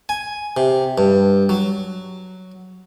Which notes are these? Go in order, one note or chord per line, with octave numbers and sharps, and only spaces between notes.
G#5
C3
G2
F#3